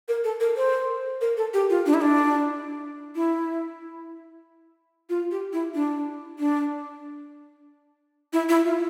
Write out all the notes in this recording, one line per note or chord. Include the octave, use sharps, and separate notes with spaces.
A#4
A4
A#4
C5
A#4
A4
G4
F4
D4
E4
D4
E4
F4
G4
E4
D4
D4
E4
E4
F4